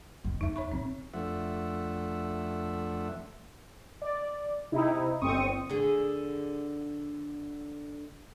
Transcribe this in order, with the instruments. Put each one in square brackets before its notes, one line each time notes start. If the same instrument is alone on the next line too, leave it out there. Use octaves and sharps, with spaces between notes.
[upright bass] F1 D#3
[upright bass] E2 A3 [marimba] D#4 E5
[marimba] C#5 B5 C#6
[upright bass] A#1 E3 [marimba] C4
[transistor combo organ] F2 F3 A3 D4 E5 F#5
[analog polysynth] D5
C3 D#4 E4
G1 C4 C#6 D#6
[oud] D3 G#4